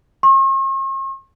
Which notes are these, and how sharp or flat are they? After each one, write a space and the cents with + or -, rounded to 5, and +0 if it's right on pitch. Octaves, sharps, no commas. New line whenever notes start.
C#6 -45